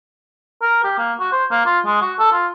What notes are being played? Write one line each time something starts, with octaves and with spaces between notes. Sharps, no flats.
A#4
G4
A#3
F#4
C5
A#3
F4
G#3
F#4
A4
F4